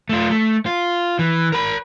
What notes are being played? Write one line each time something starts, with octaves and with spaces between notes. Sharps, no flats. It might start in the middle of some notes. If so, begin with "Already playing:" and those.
A3 F4
A3
F4
E3
A#4 B5